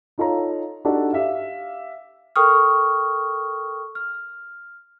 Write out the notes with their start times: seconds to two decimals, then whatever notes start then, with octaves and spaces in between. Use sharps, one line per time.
0.18 D#4 F4 A4 C#5 A#5
0.85 D4 D#4 F#4 G4 A4
1.13 G4 E5 F5
2.36 A4 A#4 G5 C#6 D#6 F6
3.95 F6